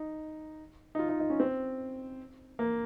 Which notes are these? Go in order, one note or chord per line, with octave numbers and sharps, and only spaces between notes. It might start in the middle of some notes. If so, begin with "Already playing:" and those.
Already playing: D#4
D#4
F4
D#4
D#4
C#4
C4
A#3